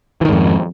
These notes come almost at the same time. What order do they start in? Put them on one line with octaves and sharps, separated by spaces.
E3 D#3 G#2 F2